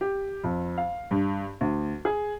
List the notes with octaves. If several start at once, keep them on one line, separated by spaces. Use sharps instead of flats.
G4
F2
F5
G2
D2
G#4